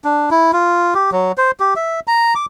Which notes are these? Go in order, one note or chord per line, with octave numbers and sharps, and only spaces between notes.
D4
E4
F4
G4
F#3
C5
G4
E5
A#5
D6